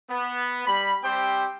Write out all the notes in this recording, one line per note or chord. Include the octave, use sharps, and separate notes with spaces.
B3
G3 B5
G3 C4 G4 C5 G5